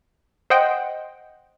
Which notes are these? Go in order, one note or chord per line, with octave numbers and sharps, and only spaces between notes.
C5 D#5 F#5 G5